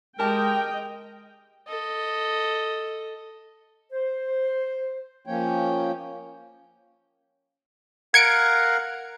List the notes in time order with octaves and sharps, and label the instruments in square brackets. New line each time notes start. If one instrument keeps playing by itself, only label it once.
[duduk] G#3 [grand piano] G4 A5 D6 [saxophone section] A#4 [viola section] D#5 G5
[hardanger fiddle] A4 D#5
[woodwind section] C5
[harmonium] F3 A#3 C#4 C#5 G5
[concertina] A#4 F5 F#5 [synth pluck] G#6 C#7 D7